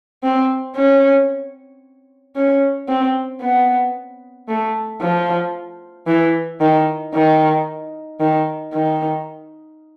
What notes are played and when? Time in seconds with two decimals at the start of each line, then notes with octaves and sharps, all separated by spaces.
0.23 C4
0.76 C#4
2.35 C#4
2.88 C4
3.41 B3
4.48 A3
5.01 F3
6.07 E3
6.61 D#3
7.14 D#3
8.20 D#3
8.73 D#3